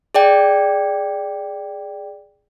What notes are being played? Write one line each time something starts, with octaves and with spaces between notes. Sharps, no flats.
G#4 D5 G5